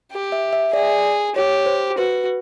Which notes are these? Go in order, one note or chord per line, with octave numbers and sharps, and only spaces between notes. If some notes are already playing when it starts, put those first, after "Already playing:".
G4
E5
E5
G#4 D5
G4 C#5
C5
F#4 B4